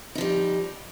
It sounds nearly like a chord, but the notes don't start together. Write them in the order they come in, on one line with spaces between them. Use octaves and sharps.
D#4 F3 G3